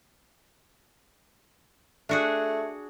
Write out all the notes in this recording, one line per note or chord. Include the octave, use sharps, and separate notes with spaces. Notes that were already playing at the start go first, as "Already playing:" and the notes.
A3 D4 F#4 G#4